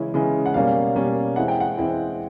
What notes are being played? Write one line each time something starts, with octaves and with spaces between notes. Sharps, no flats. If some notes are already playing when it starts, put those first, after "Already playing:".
Already playing: C#3 E3 G#3 C#4 E4
C#3 E3 G#3 C#4 E4
F#5
B2 G3 A#3 C#4 F5
B2 G3 A#3 C#4
E3 G#3 C4 E4 F#5
G5
F#5
E3 G#3 C4 E4